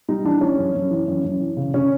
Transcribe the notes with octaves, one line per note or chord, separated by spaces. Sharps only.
G3 D#4
E3 D4
E3 C#4
F#2
F#2
E3
F#2
F#2
E3
C#3
C#3 C#4